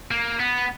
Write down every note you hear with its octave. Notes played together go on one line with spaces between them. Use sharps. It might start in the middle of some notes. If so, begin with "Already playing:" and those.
A#3
B3